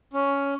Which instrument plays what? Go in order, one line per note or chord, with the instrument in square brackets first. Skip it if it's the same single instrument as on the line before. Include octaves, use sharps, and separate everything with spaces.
[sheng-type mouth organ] C#4